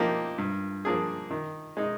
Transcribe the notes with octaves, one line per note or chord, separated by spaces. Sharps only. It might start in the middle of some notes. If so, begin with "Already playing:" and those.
Already playing: F3 A#3 D#4 G4
G2
F3 A#3 D4 G#4
D#3
G#3 D#4